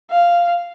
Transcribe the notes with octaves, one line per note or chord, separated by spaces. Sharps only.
F5